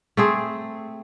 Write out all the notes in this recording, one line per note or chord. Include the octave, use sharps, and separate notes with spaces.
A3 C4 G#4